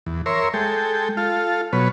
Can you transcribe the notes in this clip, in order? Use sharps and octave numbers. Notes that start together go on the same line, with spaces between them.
E2
A#4 C#5 E5 C6
G#3 A4 G5
F4 A4 F5
B2 F#3 B4 C#5